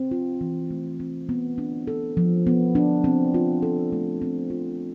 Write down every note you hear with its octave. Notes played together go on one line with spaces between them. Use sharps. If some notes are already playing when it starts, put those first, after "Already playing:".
Already playing: C4
F4
E3
A3
C4
B3
D4
A4
F3
B3
D4
C4
F4
A4
A3
C4
F4